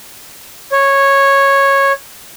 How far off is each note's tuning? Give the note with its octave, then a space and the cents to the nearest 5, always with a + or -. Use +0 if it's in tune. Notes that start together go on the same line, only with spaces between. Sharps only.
C#5 -10